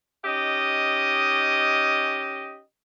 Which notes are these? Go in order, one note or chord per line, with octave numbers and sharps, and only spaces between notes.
C#4 D#4 G4 D#5